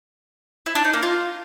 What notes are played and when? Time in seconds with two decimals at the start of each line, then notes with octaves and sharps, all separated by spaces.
0.66 E4
0.75 D4
0.84 D#4
0.93 A#3
1.03 F4